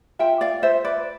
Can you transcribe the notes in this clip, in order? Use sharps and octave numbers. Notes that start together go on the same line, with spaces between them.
F4 E5 G5
D5 F5
F4 C5 E5
B4 D5